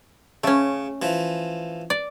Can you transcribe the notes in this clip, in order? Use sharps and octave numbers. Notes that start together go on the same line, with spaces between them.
C#3 A3 C#4
E3 F3
D5